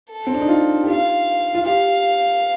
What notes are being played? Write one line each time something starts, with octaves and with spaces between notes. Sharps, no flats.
A4
C4
D4
D#4
F4
G4
F4 F5
F4
G4 F5